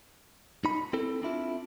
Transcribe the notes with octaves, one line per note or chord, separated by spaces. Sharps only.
D#4 B5
C4 E4 A4
C4 D4 E4 F4